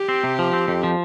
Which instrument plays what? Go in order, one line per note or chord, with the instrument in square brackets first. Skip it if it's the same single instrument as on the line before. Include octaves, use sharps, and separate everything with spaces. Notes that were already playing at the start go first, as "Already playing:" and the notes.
Already playing: [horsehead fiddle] G4
[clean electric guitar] C4
C3
F3
C4
F2
F3